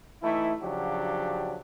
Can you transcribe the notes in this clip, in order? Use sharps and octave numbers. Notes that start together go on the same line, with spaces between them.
E3 A3 D#4 E4
C#3 F3 F#3 D4 F#4 G4